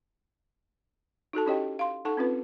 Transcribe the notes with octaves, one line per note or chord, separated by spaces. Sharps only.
D#4 F#4 A4 A5
C#4 E4 G4 C#5 D#5 G5
F5 C6
D#4 A4 F#5 A5 C#6
C4 C#4 F4 B4